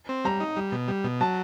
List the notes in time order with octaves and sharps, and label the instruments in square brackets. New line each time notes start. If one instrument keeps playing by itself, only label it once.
[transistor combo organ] C4
[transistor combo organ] G3 [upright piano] A#5
[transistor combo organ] D#4
G3
B2
G3
B2
[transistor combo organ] F#3 [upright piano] A5